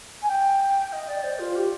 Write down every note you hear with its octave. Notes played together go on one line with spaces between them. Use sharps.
G#5
G5
D#5
D5
C5
F4
G4